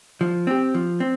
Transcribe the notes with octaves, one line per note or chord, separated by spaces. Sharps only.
F3
C4 G4
F3
C4